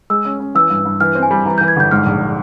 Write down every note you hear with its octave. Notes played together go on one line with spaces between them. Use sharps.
G#3 E6
C#4
C#4
E3 E6
G2
G2
E3 F6
C4
G#5
G3
E3 A#5
E3 G6
G#6
G1 G6
G#2 F6
A#1